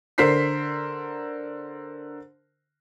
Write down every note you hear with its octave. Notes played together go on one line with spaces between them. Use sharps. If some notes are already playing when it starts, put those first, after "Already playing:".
D3 A#4 C5 B6 C7